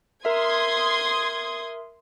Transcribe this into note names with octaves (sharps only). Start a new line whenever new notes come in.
A#4 E5 C6 D#6 G#6